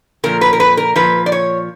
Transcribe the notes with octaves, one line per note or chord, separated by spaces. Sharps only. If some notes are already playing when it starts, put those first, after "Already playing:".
A#2 F3 A#4
B4
A#4
B4
A#4
A#2 F3 B4
D5
C#5